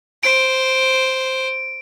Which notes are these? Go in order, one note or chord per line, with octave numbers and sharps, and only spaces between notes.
C5 D7